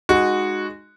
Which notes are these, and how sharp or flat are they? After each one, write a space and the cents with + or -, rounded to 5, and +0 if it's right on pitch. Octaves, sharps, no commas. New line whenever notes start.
G#3 -10 D#4 -15 F#4 -5